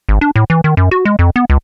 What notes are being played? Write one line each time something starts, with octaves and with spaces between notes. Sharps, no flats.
G#1
D4
A2
E3
D#3
F#2
F#4
G#3
F2
B3
C#2